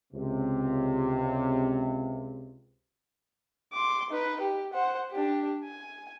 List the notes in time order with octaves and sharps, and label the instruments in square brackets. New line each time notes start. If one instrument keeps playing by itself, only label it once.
[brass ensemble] C#2 C3
[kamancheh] C6 D6
D#4 B4
G4
C5 F#5
D4 G4
G#5